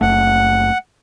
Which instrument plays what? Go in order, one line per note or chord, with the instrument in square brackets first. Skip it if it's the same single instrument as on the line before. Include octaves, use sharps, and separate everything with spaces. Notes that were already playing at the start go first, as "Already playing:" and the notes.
[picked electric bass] F#1 A3 [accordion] F#5